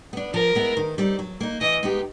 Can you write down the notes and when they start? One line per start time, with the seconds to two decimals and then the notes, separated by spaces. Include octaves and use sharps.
0.13 B3 D4
0.34 F3 A#4
0.55 G#3 B3 E4
0.77 D#3
0.98 G3 C4 D#4
1.19 F#3
1.40 A#3 D#4
1.61 E3 D#5
1.83 G#3 B3 D#4 G4